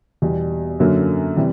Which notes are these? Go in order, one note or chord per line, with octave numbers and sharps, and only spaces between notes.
E2 B2 G3
F#2 D3 F#3 A#3
C3 E3 G3